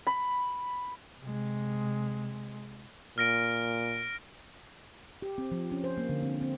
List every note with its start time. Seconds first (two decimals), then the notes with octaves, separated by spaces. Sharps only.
0.07 B5
1.20 C3 G#3
3.18 A#2 F6 A#6 D7
5.22 G4
5.38 C4
5.52 F3
5.71 C#4
5.84 C5
5.98 A#3
6.09 D3
6.23 C4
6.41 C4